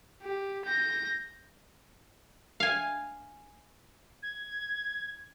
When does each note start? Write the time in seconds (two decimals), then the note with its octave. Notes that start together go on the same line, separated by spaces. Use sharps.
0.22 G4
0.65 G6 A#6
2.60 F5 G#5
4.22 G#6